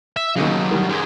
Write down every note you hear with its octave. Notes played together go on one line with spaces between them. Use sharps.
E5
D#2 C#3 F#3 D#4
D#3 G3
F#2 G#3